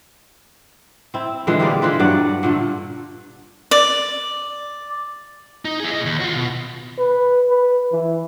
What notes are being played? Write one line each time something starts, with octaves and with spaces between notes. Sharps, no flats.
C4 E4
A#2 D3 E3 G#3
G3 A#3 G#4 D5
E3 G#3 F4 B4
G2 F#3 D5 F#5
A#2 D3 A3
D5
D#4
E4 G#4
A#2 D#5
D#2
F4 F#4
B2
B4
B4
E3